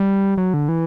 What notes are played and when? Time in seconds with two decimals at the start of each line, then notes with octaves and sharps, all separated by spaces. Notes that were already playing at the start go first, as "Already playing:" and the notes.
Already playing: G3
0.38 F#3
0.54 D3
0.69 E3